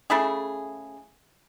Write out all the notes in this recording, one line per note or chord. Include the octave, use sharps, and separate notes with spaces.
C#3 A3 E4 G#4